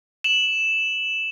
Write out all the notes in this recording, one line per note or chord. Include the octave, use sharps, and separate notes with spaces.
E7 F#7